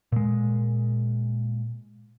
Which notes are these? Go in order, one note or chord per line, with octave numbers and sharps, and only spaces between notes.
A#2 G#3